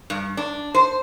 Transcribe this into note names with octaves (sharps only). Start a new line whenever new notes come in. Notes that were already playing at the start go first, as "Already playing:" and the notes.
G2
D4
C5